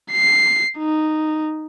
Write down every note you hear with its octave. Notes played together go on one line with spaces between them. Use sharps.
C7
D#4